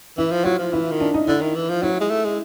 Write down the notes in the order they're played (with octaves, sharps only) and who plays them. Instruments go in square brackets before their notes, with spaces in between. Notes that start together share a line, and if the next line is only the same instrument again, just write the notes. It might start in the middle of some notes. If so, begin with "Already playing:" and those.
[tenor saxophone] E3 [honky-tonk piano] E4
[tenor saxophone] F3
[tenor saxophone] F#3 [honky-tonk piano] F4
[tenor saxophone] F3
[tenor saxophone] E3 [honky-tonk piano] E4
[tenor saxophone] D#3
[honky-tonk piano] D4
D#4
[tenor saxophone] D3 [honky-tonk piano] E4
[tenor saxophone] D#3
E3
F3
[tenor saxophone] F#3 [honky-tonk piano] E4
[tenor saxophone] G#3
A3
G#3